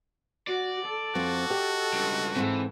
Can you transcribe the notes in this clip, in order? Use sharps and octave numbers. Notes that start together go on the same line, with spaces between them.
F#4 D5
A4
F2 C4 F#4
G4 D#5 G5
C#2 G2
G#2 E3 C4